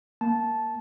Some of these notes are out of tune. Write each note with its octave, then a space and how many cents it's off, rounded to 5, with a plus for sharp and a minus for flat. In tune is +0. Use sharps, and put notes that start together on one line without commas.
A#3 +0 A5 -10